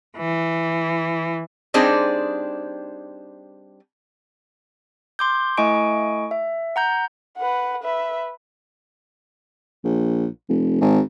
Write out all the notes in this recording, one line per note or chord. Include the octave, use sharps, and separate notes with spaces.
E3
G3 C4 D4 D#4 G#4 C5
C6 D6 G6
A3 E4 D#5 G#5 C#6 D7
E5
F#5 A#5 G6
B4 F#5
B4 E5
A#1
F1
G#1